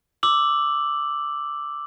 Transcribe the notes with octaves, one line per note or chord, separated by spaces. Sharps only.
D6 E6 F#7